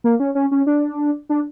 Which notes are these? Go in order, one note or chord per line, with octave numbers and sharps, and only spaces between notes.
A#3
C#4
C#4
C#4
D4
D4